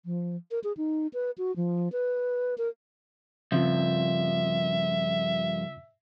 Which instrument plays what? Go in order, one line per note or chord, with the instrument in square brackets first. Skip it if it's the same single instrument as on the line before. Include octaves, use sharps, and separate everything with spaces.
[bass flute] F3
A#4
G#4
D#4
B4
F#4
F3
B4
A#4
[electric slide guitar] G2 A#2 F3 [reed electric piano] C#3 C4 F4 [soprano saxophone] E5